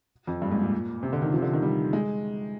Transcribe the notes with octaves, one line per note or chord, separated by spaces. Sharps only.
F2
G2
A#2
G#2
A#2
C3
D3
D#3
F3
C3
D3
D#3
G3
G#3